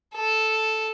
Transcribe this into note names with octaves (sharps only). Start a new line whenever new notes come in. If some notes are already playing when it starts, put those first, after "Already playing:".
A4